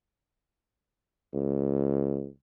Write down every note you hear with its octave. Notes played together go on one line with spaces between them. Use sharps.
C#2